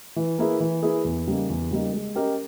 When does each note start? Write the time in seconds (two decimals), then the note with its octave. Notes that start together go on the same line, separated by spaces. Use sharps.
0.16 E3
0.38 A#3 E4 G#4 B4
0.60 E3
0.83 A#3 E4 G#4 B4
1.04 E2
1.27 C#3 G3 A#3 D#4
1.50 E2
1.71 C#3 G3 A#3 D#4
1.93 G#3
2.15 C#4 G4 A#4 D#5